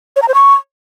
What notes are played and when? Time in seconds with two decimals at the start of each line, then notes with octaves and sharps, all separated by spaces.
0.16 C#5
0.22 A#5
0.28 C5
0.34 C#6